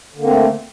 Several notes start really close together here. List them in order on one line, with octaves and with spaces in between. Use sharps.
D3 A#3 C4 A3